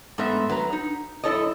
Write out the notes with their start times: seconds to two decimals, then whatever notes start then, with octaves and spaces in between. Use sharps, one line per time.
0.18 G#2 A3 B3 E5
0.49 F#3 B4 A#5
0.72 D#4
1.24 F#2 E4 A4 C#5 D#5